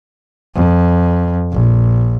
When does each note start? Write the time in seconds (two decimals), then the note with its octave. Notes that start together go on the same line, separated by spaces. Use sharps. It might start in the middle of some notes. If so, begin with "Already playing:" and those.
0.55 F2
1.53 A#1